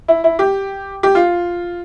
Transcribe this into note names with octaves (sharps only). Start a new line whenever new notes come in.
E4
E4
G4
G4
F4